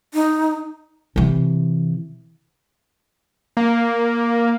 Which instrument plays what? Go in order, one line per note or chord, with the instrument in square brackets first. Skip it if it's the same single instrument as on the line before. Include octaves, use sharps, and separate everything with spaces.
[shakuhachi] D#4
[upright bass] C3 E3
[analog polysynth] A#3